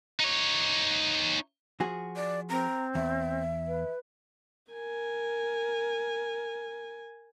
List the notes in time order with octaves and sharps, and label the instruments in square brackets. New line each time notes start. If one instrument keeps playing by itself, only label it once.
[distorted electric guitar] D#4 C#5
[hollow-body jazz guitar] F3 F#4 G#4
[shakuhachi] D5
[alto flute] C4 [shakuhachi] A#5
[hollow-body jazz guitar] E2 [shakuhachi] E5
[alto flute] B4
[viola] A#4 G#5